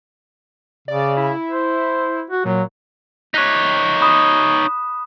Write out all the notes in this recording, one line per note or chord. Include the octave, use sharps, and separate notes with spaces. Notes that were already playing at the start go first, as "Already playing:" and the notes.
C#3 D5
E4
C5
F#4
A#2 F#3
D#4 C#5 F#6 B6
B5 D#6 E7